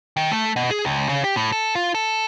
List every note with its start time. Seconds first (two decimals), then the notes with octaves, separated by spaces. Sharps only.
0.17 D#3
0.31 A3
0.56 B2
0.71 G#4
0.85 C#2
1.09 C#3
1.24 G4
1.37 A2
1.52 A4
1.75 F4
1.95 A4